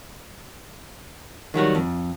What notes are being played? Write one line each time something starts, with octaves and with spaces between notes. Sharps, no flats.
D#3 F#3 G3 F#4
F2